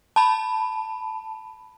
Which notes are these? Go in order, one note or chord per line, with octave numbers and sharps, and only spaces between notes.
A5 B5